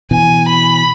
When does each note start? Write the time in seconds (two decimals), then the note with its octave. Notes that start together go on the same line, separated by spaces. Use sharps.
0.11 B2 E3 G#5
0.49 B5